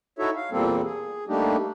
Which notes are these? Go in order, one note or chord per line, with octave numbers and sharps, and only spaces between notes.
D#4 E4 F#4 A4 C#5 E5
F5
E2 A#2 G3 A#3 C4 A4
G#4
G3 A3 A#3 D4 D#4 G4